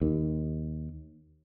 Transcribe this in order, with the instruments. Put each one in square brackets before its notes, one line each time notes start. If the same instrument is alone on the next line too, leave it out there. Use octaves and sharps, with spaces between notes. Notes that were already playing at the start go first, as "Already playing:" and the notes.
[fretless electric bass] D#2